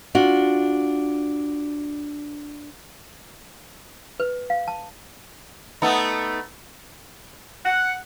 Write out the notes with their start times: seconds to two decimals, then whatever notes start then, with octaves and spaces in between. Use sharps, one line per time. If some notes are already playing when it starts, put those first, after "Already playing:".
0.15 D4 F4 F#4
4.20 B4
4.50 F5
4.68 A5
5.82 A3 B3 D#4
7.64 F#5